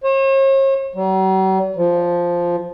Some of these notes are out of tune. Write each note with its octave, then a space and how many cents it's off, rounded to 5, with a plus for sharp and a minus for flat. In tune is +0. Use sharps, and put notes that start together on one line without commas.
C#5 -45
F#3 +45
F3 -5